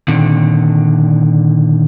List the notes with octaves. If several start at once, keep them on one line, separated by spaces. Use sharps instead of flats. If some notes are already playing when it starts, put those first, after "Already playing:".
A#2 D3 D#3 C4